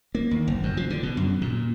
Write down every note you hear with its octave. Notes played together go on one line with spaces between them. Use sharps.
A#3
D#2
F#1
F#2
F3
D3
B2
F#2
A#2